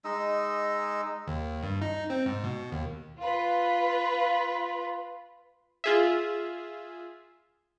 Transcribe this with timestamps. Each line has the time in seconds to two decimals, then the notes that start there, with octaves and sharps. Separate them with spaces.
0.04 G#3 D#4 D#5 E6
1.27 D#2
1.63 G2
1.82 D#4
2.10 C4
2.26 G#2
2.44 B2
2.72 D#2
3.18 F4 B4
5.84 F4 G#4 E5